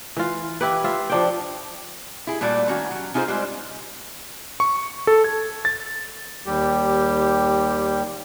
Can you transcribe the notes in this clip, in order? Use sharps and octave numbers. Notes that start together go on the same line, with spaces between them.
E3 F4
E4 G4 B4
F4 E5 F5
F3 D4 G5
E4 G#4
A#2 G3 A3 F#4 D5
D#3 C#4 F#4
F#3
C#4 D#4 F4 G4 G#4 C5
G3 G#3 C5
C#6
A4
G#6
A6
D#2 G3 G4